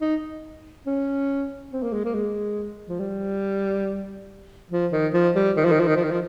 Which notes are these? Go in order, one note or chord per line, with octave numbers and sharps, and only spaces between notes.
D#4
C#4
C4
A#3
G#3
A#3
G#3
F3
G3
F3
D#3
F3
G3
D#3
F3
D#3
F3
D#3
F3
D#3
F3